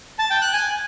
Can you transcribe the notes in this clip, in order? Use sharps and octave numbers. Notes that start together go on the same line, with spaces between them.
A5
G5
F#6
G#5